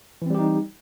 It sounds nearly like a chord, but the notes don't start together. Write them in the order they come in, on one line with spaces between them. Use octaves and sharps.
E3 C4 G3 G4 D#4